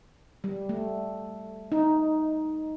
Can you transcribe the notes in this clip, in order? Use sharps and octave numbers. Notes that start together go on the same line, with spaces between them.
G3
A3
D#4